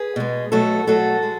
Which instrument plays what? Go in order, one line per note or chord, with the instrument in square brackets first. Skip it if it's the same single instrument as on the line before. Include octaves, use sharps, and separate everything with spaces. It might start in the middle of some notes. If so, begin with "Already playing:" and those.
Already playing: [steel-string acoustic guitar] G#4 B4
B2 G#3
B2 F#3 A3 F#4 A4
B2 F#3 A3 F#4 A4
G#3